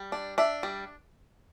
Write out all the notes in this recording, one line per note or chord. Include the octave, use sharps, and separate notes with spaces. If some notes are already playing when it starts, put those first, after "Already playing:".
Already playing: G3
D4
D4 E5
G3